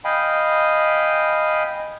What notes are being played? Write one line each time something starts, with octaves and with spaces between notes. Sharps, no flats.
D#5 F5 G5 G#5 B5